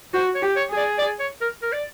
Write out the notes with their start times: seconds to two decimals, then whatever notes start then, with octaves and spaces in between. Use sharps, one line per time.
0.14 F#4 C5
0.35 C#5
0.42 G4
0.56 C#5
0.70 G#4
0.77 D5
0.98 D5
1.20 C#5
1.41 A#4
1.62 A#4
1.72 D5